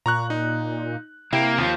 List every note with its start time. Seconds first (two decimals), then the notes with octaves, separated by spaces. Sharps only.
0.06 A#2 A#5 C#6 F#6
0.30 D#4
1.33 C3 A#3 E4 G5 E7
1.58 D#2 F3